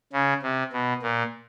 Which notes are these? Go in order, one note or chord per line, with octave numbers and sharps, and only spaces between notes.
C#3
C3
B2
A#2